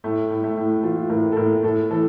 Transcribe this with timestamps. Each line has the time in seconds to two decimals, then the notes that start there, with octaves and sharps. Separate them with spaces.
0.04 A2 A3
0.30 A2
0.44 A3
0.57 A2
0.83 E3 F4
1.10 A2 A#4
1.32 A4
1.36 A2 A#4
1.63 A2 A4
1.90 E3 A4